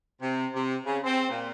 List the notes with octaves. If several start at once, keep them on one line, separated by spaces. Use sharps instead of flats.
C3
C3
C#3
C4
A#2